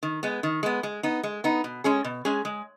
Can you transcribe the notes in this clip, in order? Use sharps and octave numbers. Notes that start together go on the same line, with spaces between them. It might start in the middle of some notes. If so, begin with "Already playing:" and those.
D#3
G#3 B3
D#3
G#3 B3
G#3
B3 D#4
G#3
B3 D#4
B2
G#3 C#4 G#4
B2
G#3 C#4 G#4
G#3